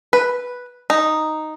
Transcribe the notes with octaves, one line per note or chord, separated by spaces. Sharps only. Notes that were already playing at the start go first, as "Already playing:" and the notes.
B4
D#4